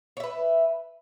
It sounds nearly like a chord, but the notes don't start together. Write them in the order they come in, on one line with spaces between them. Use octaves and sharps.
C#5 E5 B4